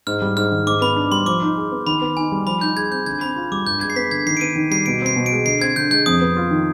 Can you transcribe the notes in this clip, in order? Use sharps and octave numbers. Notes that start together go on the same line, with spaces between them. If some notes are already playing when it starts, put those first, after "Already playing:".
G#2 F6
G3
G#2 F6
D#3
G#2 D6
B3 B5
D4
G3 C6
F3 D6
D#4
G#4
B3
D#3 B5
B3
D#4 G#5
G3
F3 B5
D#4 G6
G#4 G#6
C4 G6
D3 G#6
C4 B5
F4
G3 D6
G2 G6
G#3 G#6
C7
B3 B6
D3 G#6
D#3 C7
D7
B3 D#7
D#3
G3 C7
B2 D7
C4 C7
B2
D7
G#3
D3 C7
C4 G#6
D3 G6
G#3 G6
F2 D#6
B3
F4
D#3